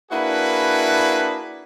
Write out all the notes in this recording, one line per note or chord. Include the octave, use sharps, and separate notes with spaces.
A#3 D4 E4 F#4 G#4 B4